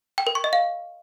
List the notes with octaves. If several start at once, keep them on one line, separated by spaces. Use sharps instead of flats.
G5
A#4
C#6
D#5
F5